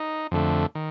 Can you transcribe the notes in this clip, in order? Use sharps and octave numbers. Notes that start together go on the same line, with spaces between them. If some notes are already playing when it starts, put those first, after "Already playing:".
Already playing: D#4
F2 D3 A3
D#3